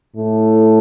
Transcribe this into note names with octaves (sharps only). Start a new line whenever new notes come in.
A2